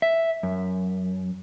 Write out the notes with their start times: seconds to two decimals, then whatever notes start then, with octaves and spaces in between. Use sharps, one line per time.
0.02 E5
0.43 F#2